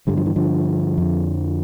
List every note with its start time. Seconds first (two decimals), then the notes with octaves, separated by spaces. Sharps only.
0.07 G2 D3 G3
0.17 F3
0.26 E3
0.36 D3 F3
0.98 F2 D3